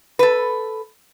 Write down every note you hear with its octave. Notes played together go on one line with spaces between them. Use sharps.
A4 B4